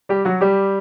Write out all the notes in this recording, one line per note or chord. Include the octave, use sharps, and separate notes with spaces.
G3 G4
F#3 F#4
G3 G4